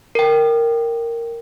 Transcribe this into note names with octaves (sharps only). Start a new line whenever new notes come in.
A#4 G5